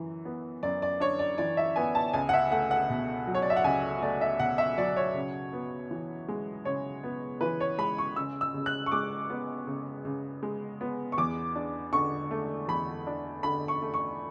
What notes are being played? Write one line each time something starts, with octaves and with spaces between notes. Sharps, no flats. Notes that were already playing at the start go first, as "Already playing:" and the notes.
Already playing: F#2 E3
B3
F#2 D5
D5
D4 C#5
D5
E3 D5
E5
B3 G#5
A5
C#2 G#5
F#5
E5
A3 F#5
F#5
B2
F#3
C#5
D5
E5
F#5
C#2 G#5
A3 D5
E5
B2 F#5
E5
F#3 D5
C#5
C#3
B3
E3
G#3
C#3 C#5
B3
E3 B4
C#5
G#3 B5
C#6
C#3 E6
E6
C#3
F#6
C#6
G#3 D6
B3
C#3
C#3
G#3
B3
C#6
E2 D6
D4
D3 C#6
A3
E2 B5
D4
D3 B5
C#6
A3
C#6